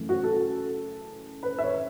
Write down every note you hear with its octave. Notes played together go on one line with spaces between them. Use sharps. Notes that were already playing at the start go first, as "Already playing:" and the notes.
Already playing: F#2 C#3 E3 A3
F#4
A4
B4
E5
C#5